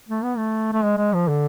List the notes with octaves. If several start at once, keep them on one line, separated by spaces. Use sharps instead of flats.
A3
B3
A3
A3
G#3
G#3
F3
D3